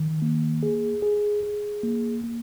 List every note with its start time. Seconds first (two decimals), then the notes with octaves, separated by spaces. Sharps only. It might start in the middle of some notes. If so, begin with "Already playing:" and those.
Already playing: D#3
0.22 A#3
0.63 G#4
1.02 G#4
1.43 G#4
1.83 A#3
2.24 A#3